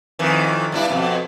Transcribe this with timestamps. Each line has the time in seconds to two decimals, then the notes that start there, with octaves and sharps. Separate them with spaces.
0.19 F2 D#3 E3
0.72 G2 D4 E4
0.90 F2 B2